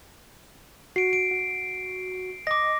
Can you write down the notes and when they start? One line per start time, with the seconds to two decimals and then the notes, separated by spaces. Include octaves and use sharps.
0.96 F#4 C7 D7
1.13 D7
1.31 F#4
2.47 D#5 D6 A#6